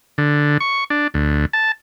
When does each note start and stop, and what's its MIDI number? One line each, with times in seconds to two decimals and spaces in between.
0.18 0.58 50
0.60 0.84 85
0.90 1.08 62
1.14 1.46 38
1.53 1.72 81